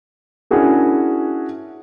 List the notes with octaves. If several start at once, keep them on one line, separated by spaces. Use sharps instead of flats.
C#4 D4 E4 F#4 G#4 A#4